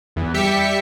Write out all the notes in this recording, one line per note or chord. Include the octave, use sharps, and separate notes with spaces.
E2 E3
G3 G4 E5 B6 C#7